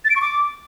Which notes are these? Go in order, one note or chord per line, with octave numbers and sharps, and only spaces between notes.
A6
D7
C#6
D6